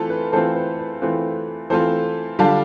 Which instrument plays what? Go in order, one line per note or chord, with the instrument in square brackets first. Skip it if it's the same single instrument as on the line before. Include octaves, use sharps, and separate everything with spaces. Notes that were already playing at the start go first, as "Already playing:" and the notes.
Already playing: [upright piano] E3 A3 C4 F4 A4
B4
E3 A3 C4 F4 A4 C5
B4
B4
E3 A3 C4 F4 B4
E3 A3 C4 F4 A4 C5
D3 G3 D4 F4 F5 A5